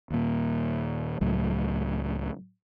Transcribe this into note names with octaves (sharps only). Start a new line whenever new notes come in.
D#2 A#2
C#2 A2 F#3